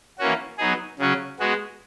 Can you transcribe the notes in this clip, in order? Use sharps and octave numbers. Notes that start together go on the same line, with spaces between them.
E3 A#3 C#4 F#4
F#3 B3 D#4 G#4
C#3 F#3 C#4 F#4
G#3 B3 F#4